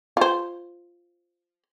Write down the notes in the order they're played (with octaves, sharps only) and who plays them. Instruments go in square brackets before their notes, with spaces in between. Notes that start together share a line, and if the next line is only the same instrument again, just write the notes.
[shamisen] F4 C5